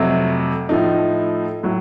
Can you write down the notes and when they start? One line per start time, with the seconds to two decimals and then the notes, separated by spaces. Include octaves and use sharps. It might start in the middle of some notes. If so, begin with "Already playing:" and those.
Already playing: F2 C3 F#3 A3
0.69 A2 F3 A3 D#4
1.63 A2 F#3